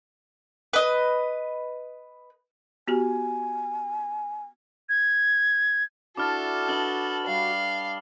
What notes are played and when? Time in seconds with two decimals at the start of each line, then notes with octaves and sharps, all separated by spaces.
0.73 B4 D#5
2.88 B3 F#4 G4 G#5
4.89 G#6
6.17 D4 E4 F#4 A4 D6 F6 A6
6.69 D4 B4 D#5 F6 F#7 G7
7.26 G3 F5